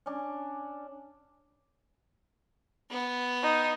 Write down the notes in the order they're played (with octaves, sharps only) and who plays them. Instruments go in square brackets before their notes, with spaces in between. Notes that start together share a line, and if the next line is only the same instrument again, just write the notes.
[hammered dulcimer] C#4 D4
[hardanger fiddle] B3
[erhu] D#4